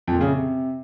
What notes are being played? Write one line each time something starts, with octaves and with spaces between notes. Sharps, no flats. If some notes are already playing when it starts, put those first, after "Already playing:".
F2
A#2
C#3
C3